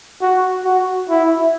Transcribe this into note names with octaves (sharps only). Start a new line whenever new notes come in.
F#4
F#4
E4